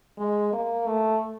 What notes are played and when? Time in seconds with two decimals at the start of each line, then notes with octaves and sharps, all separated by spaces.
0.18 G#3
0.53 A#3
0.87 A3